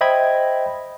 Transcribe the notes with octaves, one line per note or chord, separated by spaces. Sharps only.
C5 D#5 E5 G5 B5 G#6